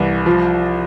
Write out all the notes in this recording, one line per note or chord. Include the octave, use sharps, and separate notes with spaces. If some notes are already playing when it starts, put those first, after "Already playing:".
Already playing: C2 E3
F3